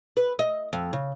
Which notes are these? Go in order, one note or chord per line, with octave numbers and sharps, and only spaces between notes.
B4
D#5
F2
C#3